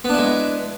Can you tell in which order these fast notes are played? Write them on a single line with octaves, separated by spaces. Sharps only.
B3 D4 E4 G#3